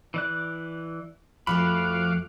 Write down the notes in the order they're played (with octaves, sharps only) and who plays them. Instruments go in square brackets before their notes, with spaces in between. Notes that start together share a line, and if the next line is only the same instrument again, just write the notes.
[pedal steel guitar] E3 D5 F#6
[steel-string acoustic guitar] F2 F3 A3 [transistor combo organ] F#4 F5 D6 [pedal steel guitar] B5